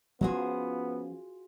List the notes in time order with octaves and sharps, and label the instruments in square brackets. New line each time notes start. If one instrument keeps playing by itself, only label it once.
[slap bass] F3 C#4 [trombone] B3 [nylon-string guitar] F4 F#4 G#4